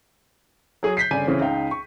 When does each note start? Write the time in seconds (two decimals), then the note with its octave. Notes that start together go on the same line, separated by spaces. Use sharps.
0.83 F#3 G#4 D#6
0.97 G6 B6 C7
1.11 G1 C#3 D5 G#5 D#7
1.27 C#3 E3 C4 C#4
1.40 C#2 D#4 F5 G5
1.71 C#6